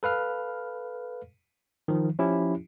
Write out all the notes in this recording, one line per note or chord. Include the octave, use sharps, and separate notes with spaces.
A4 B4 F5 F6
D#3 F3
F3 C#4 E4 G4